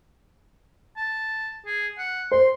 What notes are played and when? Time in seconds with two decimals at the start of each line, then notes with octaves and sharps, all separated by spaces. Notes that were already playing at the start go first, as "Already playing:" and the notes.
0.97 A5
1.66 G#4
1.98 F#5
2.32 C5 C6